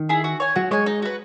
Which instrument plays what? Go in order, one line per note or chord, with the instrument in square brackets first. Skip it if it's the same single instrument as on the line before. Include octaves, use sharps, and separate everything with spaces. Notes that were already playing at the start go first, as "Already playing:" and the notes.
Already playing: [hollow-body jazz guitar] D#3
[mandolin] E4 G#4
F#4
C#5 G#5
[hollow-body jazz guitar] F#3 [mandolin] F#4
[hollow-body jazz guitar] G#3 [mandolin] C#5 G#5
[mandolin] D#4
F#4 B4